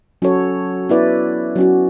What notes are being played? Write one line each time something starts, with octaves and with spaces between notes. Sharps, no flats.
F#3 C#4 F#4 A4 C#5
B3 E4 B4 D5
F#3 C#4 F#4